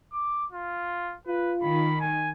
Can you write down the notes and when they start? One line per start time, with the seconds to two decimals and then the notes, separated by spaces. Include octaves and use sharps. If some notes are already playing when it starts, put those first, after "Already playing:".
0.13 D6
0.52 F4
1.27 F4 B4
1.63 D#3 B5
2.00 G#5